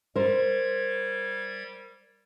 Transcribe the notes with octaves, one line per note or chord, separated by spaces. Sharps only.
G3 A#4 C5 G#6